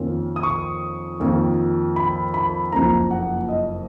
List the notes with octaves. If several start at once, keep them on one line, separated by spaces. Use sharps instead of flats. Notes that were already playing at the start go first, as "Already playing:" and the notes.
Already playing: F2 D#3 A#3 C#4 F4
D#6
C#6
F2 D#3 A#3 F4
B5
B5
F#1 F2 C#3 F3 A#3 A#5
F#5
D#5